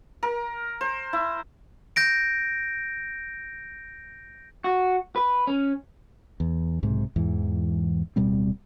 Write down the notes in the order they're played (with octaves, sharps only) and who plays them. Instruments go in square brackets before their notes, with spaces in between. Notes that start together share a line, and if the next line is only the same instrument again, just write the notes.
[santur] A#4
C5
E4
[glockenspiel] G6 A#6 D7
[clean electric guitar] F#4
B4
C#4
[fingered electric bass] E2
B1 G#2 C3
E2 G#2 E3
D1 B2 G3 C4